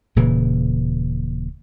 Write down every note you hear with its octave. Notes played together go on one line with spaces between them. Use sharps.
D#1 A#2 C#3 E3